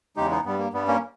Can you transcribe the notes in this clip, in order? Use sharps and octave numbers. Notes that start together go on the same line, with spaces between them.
E2 C#3 G#3 D#4 G4
B3 D#4
G2 G3 B3
A#3
G2 G3 B3
A#3 C#4